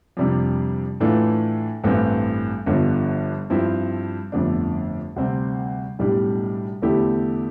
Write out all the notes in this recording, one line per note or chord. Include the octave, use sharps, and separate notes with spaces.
F2 C3 G3 D4
A2 E3 A3 D4 F4
A1 G2 E3 A3 C4
G1 G2 D3 F3
G2 F3 C4 E4
G1 F2 D3 A3 D4
D2 C3 G3 C4
B1 A2 G3 D4 G4
E2 D3 A3 E4 G4